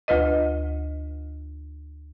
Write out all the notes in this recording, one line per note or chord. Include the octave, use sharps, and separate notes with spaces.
D2 F4 B4 D#5